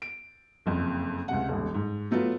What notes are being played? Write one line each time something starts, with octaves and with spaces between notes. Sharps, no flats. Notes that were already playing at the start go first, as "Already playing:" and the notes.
D7
F#1 F2
C#2 C3 F#5
D#1 G#1
G#2
F#3 A3 B3 F4